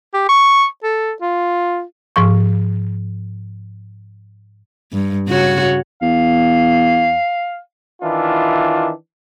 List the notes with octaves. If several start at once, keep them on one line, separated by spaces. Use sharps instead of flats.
G4
C#6
A4
F4
G#2 F3 C#6
G2
C#3 F#4 C#5
E2 F5
D#3 E3 D4 E4 F4